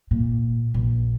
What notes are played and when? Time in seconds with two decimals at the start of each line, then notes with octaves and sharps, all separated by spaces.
0.11 A#2
0.74 A#1